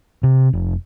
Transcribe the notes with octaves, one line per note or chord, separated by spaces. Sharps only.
C3
F1